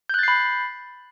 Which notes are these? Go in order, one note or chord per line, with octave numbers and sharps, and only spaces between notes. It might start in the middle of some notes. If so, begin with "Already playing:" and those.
B5 F#6 G6 A6 C7